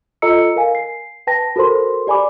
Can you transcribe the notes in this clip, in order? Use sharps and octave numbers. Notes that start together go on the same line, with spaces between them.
F4 A4 D#5 A#5 E6 C#7
A#4 F5 G#5
C7
B4 G5 A5 A#6
F#4 A4 A#4 C5 C6
G4 D5 G#5 B5 D6